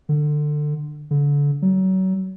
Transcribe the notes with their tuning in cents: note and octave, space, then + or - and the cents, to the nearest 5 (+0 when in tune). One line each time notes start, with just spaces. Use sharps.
D3 +20
D3 -30
F#3 +30